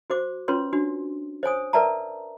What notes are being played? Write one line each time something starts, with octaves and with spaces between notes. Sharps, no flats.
F#4 C5 D6
C#4 F4 B4 C#5 C6
D4 F#4
C5 C#5 G#5 D#6
A#4 B4 D5 E5 A5 A#5